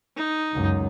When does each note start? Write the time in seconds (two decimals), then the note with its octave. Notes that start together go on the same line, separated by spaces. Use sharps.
0.16 D#4
0.54 C#2 F#2